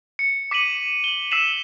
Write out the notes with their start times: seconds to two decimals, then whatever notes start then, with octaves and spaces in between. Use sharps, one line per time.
0.19 C#7
0.51 D6 B6 C#7 D#7 F#7
1.04 F#7 G7
1.31 E6 B6 C7 E7 F#7